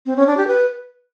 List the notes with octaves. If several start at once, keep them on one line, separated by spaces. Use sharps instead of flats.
C4
C#4
D4
G4
B4